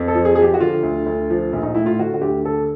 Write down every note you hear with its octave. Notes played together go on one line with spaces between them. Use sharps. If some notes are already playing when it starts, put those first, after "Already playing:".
Already playing: F2
A4
F3
G#4
F3 G#4
G4
F#4
D3 F4
D2
D2
F3
A#1
D#4
A2 E4
F4
D3 F#4
F#4
D2 G4
D3 A4